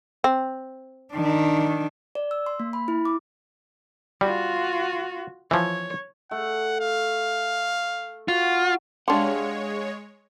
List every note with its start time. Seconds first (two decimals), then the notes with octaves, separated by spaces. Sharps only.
0.24 C4
1.14 D#3 D4
2.15 D5
2.31 E6
2.46 C6
2.60 A#3
2.73 B5
2.88 E4
3.05 D6
4.21 G3 F4 F#4
5.51 E3 F3 C#5
6.31 A3 F#5
6.81 F5
8.28 F4 F#4
9.08 G#3 D4 G4 G#4 C#5 F5 F#5 C6